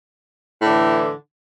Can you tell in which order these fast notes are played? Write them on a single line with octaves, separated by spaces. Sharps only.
A2 D3 E3